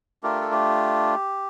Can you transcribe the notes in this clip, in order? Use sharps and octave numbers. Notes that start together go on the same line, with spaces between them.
A3 D4 F4 G4 A#4
A4
G4